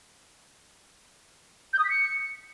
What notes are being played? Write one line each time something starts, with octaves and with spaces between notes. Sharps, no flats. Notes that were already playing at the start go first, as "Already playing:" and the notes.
G6
D#6
B6
C#7